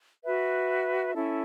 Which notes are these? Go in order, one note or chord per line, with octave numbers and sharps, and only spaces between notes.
F#4 B4 E5
C#4 E4 A4